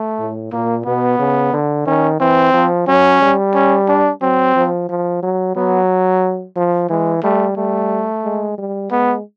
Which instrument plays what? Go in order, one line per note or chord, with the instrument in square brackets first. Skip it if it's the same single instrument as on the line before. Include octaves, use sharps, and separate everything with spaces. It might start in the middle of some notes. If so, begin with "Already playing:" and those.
Already playing: [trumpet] A3
[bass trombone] A2
[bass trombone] A#2 [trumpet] A#3
[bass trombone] B2 [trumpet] B3
[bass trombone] C#3
D3
[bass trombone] D#3 [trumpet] C#4
[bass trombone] E3 [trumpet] C4
[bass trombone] F3
[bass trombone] F#3 [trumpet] C#4
[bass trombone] G3
[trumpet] C#4
D4
[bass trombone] F#3 [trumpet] C4
[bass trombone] F3
F3
F#3
[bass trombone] F#3 [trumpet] B3
[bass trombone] F3
[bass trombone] E3 [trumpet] G#3
[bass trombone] G3 [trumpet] A3
[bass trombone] G3 [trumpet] A3
[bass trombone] G#3
G3
[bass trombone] G#3 [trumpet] B3